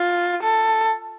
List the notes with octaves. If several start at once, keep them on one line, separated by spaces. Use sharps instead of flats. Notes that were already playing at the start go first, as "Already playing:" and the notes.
Already playing: F4
A4